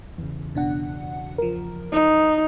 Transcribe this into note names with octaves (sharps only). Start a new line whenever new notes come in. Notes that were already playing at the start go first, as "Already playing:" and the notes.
E2 C#3
B2 D4 F#5
F3 A#4
D#4